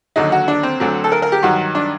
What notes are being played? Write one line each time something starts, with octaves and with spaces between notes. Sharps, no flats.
D#2 D3 F#3 D#4
F#4
D4
C4
D2 D3 F#3
A4
A#4
A#4
G4
G2 D#3 F#3 F#4
D4